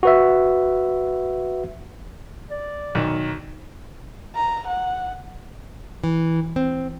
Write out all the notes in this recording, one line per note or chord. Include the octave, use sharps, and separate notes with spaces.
F#4 B4 E5
D5
B1 D#3
A#5
F#5
E3
C4